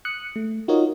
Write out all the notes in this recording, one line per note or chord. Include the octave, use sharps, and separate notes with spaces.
D#6 F#6 C#7
A3
D#4 F4 F#4 A#4 C#5 D#5